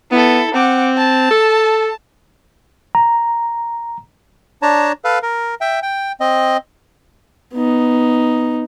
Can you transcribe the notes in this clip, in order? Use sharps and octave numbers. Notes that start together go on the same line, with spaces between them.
B3 E4 A4
C4 F#5 D6
A5
A4
A#5
D4 C#5 A5 A#5
A4 B4 F5
A#4
E5 G5
G5
C4 D#5
B3 D#4